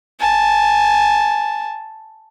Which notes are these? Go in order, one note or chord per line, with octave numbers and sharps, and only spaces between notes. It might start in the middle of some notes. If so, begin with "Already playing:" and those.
G#5 A5